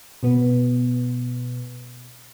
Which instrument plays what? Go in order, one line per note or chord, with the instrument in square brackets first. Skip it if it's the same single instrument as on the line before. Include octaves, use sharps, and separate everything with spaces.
[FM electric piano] B2 B3